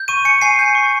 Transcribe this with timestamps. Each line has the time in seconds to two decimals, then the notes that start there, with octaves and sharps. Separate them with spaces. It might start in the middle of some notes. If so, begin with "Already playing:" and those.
Already playing: G6
0.08 C#6 D#7
0.25 G#5 C#7
0.41 G#5 C7
0.59 G6
0.75 C#6